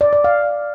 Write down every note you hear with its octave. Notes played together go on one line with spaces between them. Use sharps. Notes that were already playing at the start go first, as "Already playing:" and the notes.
D5
D5
F5